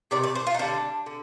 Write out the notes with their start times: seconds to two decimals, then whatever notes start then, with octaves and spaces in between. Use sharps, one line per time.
0.11 C3 D#3 D5
0.24 D5
0.35 C5
0.47 F4
0.54 D#4
0.59 D3 G3 D4
1.06 D3